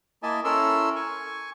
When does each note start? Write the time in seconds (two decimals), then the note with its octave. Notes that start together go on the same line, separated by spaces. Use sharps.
0.23 A#3 E4 D#5 E5 G#5 A5
0.44 C#4 E4 A4 A#4 C6 E6
0.96 G#5 C#6